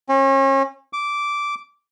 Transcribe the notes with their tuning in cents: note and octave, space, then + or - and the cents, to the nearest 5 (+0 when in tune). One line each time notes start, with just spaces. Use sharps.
C#4 -35
D6 -10